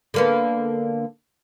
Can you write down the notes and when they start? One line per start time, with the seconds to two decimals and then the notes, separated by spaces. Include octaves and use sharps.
0.14 D3 A#3 B3